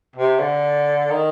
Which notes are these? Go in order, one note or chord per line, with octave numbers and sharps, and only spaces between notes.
C3
D3
D#3